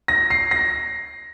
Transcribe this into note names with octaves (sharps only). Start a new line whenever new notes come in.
A#6
C7
A#6